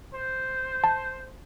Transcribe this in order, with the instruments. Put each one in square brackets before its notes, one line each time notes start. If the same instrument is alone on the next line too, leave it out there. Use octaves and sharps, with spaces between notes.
[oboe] C5
[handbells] A5